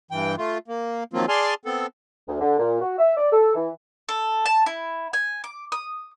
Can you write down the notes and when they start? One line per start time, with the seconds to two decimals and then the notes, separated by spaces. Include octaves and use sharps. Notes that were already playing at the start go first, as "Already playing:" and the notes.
0.11 G2 E3 G5
0.38 A3 F4
0.68 A#3
1.13 D#3 F3 F#3 A#3 C4 F4
1.29 G#4 D5 G#5 A5 C6 F6
1.65 B3 C4 A4
2.28 D2
2.41 D3
2.59 A#2
2.81 F#4
2.99 E5
3.17 D5
3.33 A4
3.55 E3
4.09 A4
4.46 A5
4.66 E4
5.13 G#5
5.44 D6
5.72 D#6